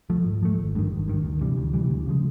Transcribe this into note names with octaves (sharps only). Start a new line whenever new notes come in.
F3 A3
G#2
F3 A3
G#1
G2 D#3
G#1
G2 D#3
D2
C3 E3 G3
D2
C3 E3 G3
D2
C#3 F3 G#3